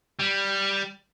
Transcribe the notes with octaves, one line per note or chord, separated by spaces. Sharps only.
G3